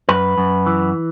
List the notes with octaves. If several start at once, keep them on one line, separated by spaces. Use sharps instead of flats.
F#2 B4
F#2
E3